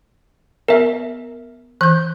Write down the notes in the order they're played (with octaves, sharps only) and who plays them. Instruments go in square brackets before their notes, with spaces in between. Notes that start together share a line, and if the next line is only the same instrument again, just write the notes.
[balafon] B3 [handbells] A#4 E5
[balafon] E3 [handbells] F#6 G6